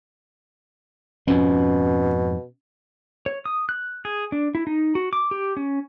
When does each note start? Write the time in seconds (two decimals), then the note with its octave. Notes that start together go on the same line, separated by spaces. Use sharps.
1.27 F2 G#2 B2 F3 C#4
3.26 C#5
3.46 D#6
3.69 F#6
4.05 G#4
4.32 D4
4.55 E4
4.67 D#4
4.95 F#4
5.13 D6
5.31 G4
5.57 C#4